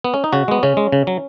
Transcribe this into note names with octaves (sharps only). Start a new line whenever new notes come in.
B3
C#4
D#4
C#3 F#4
G#3 B3
C#3 C#4
G#3
C#3
F#3